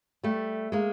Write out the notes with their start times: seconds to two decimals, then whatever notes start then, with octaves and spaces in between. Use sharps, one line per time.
0.23 G3 A3
0.72 G#3 A#3